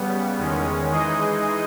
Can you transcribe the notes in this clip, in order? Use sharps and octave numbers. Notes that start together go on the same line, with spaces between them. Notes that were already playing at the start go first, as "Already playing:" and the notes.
Already playing: C#3 G3 B3
E2 D#3 G#3 C#4
E3 G#3 D#4 G#4 D#5